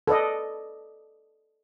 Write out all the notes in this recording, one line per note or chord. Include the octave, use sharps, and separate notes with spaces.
A4 B4 D5 D#5